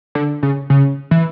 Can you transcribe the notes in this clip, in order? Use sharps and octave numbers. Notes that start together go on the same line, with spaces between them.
D3
C#3
C#3
E3